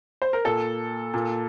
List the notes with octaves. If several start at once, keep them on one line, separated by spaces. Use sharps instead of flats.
C5
A#4
A#2 A4
A#2